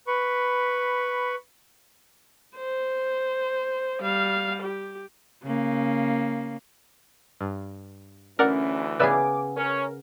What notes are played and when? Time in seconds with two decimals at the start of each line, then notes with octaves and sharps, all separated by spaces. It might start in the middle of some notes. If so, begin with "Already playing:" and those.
0.07 B4 B5 C#6
2.57 C5
4.02 G3 F5
4.63 G4
5.43 C#3 A#3
7.41 G2
8.39 D2 E3 C#4 A#4 D5 F#5
9.00 C#3 B3 G#4 B4 D5 E5 D6
9.57 C#4 A#4